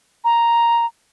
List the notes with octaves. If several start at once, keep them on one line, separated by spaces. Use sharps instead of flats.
A#5